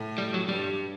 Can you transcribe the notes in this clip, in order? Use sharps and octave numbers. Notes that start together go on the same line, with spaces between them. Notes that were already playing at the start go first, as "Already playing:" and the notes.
Already playing: A2
G3
F#3
G2 G3